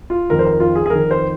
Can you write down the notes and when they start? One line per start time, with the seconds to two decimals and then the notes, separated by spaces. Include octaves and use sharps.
0.10 F4
0.30 F2 D#3 A#4
0.39 C5
0.45 A#4
0.60 F4
0.75 G#4
0.86 G#4
0.90 F2 D#3 A#4
1.11 C5